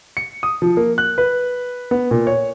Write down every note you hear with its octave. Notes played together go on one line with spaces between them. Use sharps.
C#7
D#6
F3
A#3
F#6
B4
B3
A#2
C#5